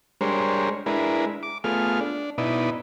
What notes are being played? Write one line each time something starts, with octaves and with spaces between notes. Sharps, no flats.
G3 G#3 D4 A#4 C5 C#5
G#3 D4 E4 A#4 B4
D6
A3 B3 F4 G#4 F6
D4
B2 D#4 E4 B4 D5